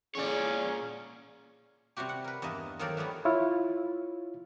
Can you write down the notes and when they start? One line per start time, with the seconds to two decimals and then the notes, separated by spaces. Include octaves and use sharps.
0.15 E2 A#2 D3 C#4 G#4 C#5 D5
1.97 C3 G3 E4 F#4 G4
2.09 F#5
2.24 A#4 B4
2.42 E2 G2 A#3 D#5 E5 A5
2.79 D#3 F3 F#3 A4 A#4 D5
2.97 E3 G3 A3 B3 F#4
3.25 E4 F4 C#5